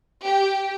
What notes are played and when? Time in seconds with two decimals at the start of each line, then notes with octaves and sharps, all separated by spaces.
0.23 G4